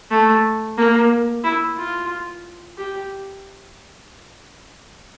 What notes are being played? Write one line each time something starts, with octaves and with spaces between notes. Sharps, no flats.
A3
A#3
E4
F4
G4